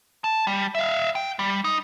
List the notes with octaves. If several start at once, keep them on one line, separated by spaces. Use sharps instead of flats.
A5
G3
E5 F5
G5
G3
D#4